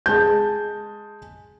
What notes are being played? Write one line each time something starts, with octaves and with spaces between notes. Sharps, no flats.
G#3 A5 G6